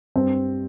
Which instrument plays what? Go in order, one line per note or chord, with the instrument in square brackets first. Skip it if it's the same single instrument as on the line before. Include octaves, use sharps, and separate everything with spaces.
[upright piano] G2 G3 C4